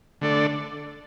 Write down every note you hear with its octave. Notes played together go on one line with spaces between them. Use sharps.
D3 A3 D4 A4 D5